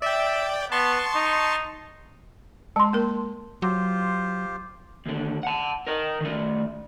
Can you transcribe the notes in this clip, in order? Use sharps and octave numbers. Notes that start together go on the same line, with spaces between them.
D5 E5 G5
B3 A5 C6 C#6
D#4
G#3 A5 C6
A#3 A#4
F#3 F4 G4 C5
D#2 D3
F#5 A5
A#4 D#5
D#3 A3